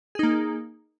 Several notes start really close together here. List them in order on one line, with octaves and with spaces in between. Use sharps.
G#4 D#4 A#3